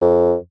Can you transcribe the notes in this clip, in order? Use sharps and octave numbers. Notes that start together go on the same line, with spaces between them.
F2